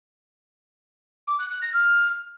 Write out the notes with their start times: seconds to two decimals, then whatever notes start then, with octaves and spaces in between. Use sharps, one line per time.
1.28 D6
1.39 F#6
1.51 F#6
1.62 A#6
1.74 F6